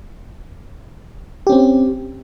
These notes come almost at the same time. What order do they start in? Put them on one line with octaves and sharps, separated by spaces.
G4 C#4 C4